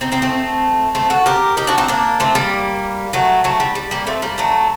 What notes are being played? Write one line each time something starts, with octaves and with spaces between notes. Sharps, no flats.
C4 D#4
C4 D#4
A3 C4
A3 C4
F#4 A4
G4 A#4
D#4 G4
D4 F#4
C4 D#4
A#3 D4
A3 C4
G3 A#3
F#3 A3
F#3 A3
G3
G3
G3 A#3
A3 C4
G3 A#3
F#3 A3